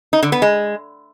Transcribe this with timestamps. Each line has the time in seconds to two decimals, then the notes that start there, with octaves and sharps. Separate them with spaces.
0.13 D#4
0.23 D3
0.32 B3
0.42 G#3